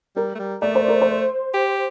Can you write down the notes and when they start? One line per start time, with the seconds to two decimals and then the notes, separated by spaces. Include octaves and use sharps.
0.16 G3 A#4
0.35 A3
0.39 G3
0.62 A3 D5
0.75 C5
0.88 A#4
1.01 C5
1.54 G4